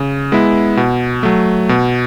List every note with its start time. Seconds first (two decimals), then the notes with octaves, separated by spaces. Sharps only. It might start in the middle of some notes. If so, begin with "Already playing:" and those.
Already playing: C#3
0.32 G#3 B3 E4
0.77 B2
1.23 F#3 A3
1.69 B2